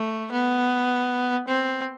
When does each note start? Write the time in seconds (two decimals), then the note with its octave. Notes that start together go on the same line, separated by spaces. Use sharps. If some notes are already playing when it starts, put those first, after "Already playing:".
Already playing: A3
0.32 B3
1.48 C4